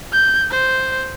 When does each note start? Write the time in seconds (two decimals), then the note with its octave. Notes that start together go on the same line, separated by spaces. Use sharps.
0.12 G6
0.51 C5